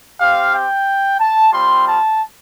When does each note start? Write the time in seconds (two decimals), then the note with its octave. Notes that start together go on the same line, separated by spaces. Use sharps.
0.20 C4 G4 F5
0.54 G5
1.20 A5
1.53 G3 C4 F4 C6
1.86 A5